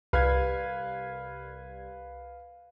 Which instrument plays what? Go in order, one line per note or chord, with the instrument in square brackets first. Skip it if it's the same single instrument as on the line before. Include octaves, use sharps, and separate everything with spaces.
[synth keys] C2 G#6 [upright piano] B4 F5